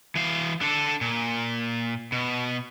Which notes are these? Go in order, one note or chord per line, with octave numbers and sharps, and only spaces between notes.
E3 F5
D4 A4
A#2
B2